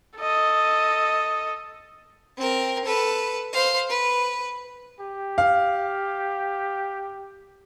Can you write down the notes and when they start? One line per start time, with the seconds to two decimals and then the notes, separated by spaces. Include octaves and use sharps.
0.17 A4 D#5
2.37 C4 A#4
2.85 A4 B4
3.53 C5 F5
3.89 B4
5.00 G4
5.38 F5